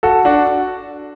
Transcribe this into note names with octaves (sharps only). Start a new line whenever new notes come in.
F#4 A4
D4 F#4